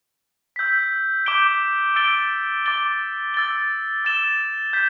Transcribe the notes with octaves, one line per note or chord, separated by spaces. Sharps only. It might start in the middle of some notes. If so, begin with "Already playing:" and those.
E6 G6 B6
D6 G6 D7 G7
E6 A6 D7 G7
D6 A6 G7
E6 A6 G7
E6 A6 E7 G7
G6 B6